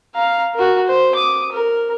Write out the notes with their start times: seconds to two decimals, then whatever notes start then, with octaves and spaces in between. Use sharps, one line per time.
0.15 F5 A#5
0.55 F#4 A#4
0.86 C5
1.15 D6 D#6
1.52 A#4